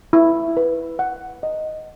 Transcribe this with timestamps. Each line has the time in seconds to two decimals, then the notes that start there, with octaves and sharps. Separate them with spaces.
0.13 E4
0.57 B4
0.99 F#5
1.43 D#5